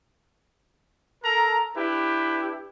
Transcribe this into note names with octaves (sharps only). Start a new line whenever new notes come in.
A4 A#4 A5 A#5
D4 E4 G4 B4